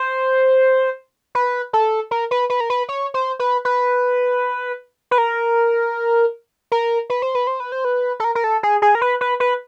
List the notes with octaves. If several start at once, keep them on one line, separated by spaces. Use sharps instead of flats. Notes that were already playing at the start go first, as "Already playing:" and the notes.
Already playing: C5
B4
A4
A#4
B4
B4
A#4
B4
C#5
C5
B4
B4
B4
A#4
A#4
B4
C5
B4
C5
B4
C5
B4
A4
A#4
A#4
A4
G#4
G#4
A#4
B4
B4
B4